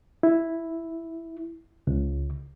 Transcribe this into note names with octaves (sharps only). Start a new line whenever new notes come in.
E4
C#2